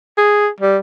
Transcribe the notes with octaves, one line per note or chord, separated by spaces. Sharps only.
G#4
G3